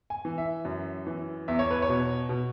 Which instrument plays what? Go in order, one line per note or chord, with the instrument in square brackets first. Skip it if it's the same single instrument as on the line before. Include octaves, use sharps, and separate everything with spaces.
[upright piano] G#5
E3
E5
F#2
E3
E2 E5
C#5
B4
C#5
B2
B2